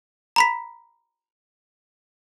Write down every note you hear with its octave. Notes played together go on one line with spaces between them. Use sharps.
A#5 B5 B6